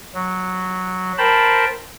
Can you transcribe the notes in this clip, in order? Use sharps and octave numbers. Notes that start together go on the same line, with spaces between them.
F#3
A#4 C5 G5 A5 B5